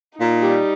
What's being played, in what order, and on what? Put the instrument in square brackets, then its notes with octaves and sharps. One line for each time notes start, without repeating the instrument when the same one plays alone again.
[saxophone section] A#2 [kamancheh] D#4
[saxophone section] G3